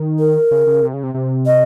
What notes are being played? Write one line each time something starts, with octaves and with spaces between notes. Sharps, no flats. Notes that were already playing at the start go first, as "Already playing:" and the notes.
Already playing: D#3
A#4
C#3
C#3
C3
C#3
C3
C3
D#5